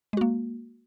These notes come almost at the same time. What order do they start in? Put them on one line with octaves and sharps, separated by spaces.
G#3 F#4 A#3